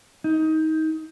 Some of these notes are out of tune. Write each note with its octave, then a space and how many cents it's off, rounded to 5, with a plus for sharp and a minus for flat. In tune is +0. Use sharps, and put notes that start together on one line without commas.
D#4 +20